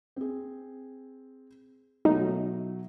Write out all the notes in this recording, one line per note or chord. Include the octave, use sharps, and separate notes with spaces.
C4 G#4
B2 F#3 A3 D#4